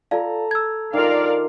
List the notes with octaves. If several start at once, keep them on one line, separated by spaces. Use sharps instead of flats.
F4 A4 D5 F5 A#5
E6 G#6
D#3 F4 A#4 D5 F5